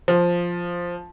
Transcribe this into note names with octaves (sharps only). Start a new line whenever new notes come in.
F3